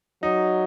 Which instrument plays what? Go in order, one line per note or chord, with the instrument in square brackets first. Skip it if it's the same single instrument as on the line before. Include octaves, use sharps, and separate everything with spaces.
[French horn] F#3 [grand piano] D#4